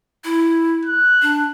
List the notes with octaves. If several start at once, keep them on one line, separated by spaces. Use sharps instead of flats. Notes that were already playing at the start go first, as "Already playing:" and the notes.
E4
F#6
D4